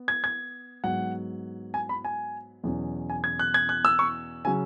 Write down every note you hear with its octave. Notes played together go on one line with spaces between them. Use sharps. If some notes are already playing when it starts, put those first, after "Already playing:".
Already playing: B3
G#6
G#6
G#2 F#3 B3 F#5
G#5
B5
G#5
E2 B2 F#3 C#4
G#5
G#6
F#6
G#6
F#6
E6
C#6
C#3 F#3 C#4 G#5